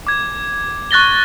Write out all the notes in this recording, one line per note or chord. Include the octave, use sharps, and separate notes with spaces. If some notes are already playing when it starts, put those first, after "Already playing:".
D6 G#6
C#6 F#6 A6 A#6 G7